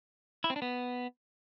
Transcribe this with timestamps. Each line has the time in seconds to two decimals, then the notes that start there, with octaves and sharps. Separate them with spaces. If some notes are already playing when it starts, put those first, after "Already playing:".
0.44 E4
0.50 C4
0.56 D4
0.62 B3